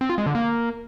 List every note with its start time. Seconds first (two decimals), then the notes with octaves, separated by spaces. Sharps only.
0.01 C4
0.09 F4
0.18 G#3
0.26 D3
0.35 A#3